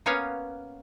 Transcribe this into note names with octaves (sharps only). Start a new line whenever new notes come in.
A#3 B3 C#4 C#5 F5 F#5